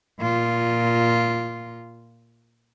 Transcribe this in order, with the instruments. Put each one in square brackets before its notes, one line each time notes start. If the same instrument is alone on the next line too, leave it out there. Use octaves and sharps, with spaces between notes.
[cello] A#2 F4